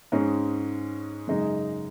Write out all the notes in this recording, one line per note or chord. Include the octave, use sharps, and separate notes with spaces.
G#2 G#3 C#4
F#2 C#3 G#3 D#4